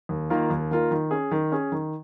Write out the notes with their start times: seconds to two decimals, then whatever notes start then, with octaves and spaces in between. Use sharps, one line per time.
0.09 D#2
0.30 D#3 A#3 F4 A#4
0.50 D#2
0.71 D#3 A#3 F4 A#4
0.91 D#3
1.11 C#4 G#4
1.31 D#3
1.52 C#4 G#4
1.72 D#3